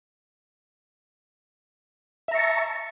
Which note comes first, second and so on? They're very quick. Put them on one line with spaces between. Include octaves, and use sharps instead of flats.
E5 A#5 C#6 A5